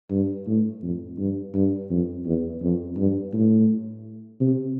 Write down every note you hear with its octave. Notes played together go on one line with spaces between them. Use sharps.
G2
A2
F2
G2
G2
F2
E2
F2
G2
A2
C3